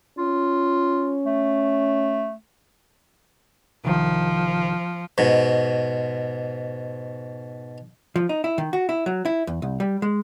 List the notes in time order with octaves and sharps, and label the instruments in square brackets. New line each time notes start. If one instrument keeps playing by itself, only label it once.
[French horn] C#4 [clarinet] F4
[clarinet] A3
[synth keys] C2 D#3 [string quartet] F3
[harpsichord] G#2 B2
[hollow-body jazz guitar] F3
D#4
E4
D#3
F#4
E4
F#3
E4
E2
C2
G3
G#3